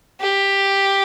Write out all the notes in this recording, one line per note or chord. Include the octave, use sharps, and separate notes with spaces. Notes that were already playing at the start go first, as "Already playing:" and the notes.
G4